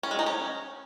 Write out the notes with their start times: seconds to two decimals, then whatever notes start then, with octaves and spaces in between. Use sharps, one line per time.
0.03 C#4
0.11 G#3
0.19 D#4
0.26 C#4